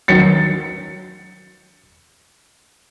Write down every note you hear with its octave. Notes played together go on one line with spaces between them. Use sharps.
D#3 F#3 A6 B6 C#7